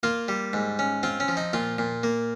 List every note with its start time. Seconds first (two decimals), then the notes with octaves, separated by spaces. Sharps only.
0.03 A#3 F4
0.28 G3
0.53 G#2
0.79 C#4
1.03 C4 F4
1.20 C#4
1.28 F3
1.37 D#4
1.53 A#2 F4
1.78 A#2
2.03 A#3